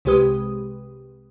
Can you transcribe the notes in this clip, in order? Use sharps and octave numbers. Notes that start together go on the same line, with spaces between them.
C2 C3 G#3 G4 B4 D#6